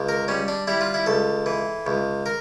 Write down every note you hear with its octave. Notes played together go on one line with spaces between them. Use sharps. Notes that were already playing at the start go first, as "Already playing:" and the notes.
Already playing: C#2
A#4
G3 C#4
D4
G3 E4
F4
E4
C#2 A4
E3
C#2
A#4